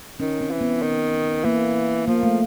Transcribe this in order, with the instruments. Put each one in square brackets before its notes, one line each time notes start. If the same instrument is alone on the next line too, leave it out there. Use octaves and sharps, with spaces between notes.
[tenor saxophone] D#3 [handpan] C#4
[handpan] C4
[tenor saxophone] E3
[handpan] B3
[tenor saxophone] D#3
[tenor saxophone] E3 [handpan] A#3
[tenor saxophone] F3 [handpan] A#3
[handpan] A3